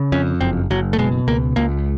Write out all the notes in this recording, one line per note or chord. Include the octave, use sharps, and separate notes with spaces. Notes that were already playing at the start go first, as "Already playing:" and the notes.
Already playing: C#3
F2 C#4
F#1 C4
F#1 F#3
A3
B2 G#3
C#2 A#3
C#2 A#3